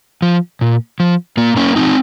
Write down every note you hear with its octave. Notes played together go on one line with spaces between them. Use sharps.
F3
A#2
F3
A#2 A#3
A#3 C#4
F3 C4 D#4